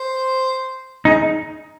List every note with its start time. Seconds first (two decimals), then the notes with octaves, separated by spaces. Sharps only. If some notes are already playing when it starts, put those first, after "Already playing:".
Already playing: C5
1.05 D#4 G#4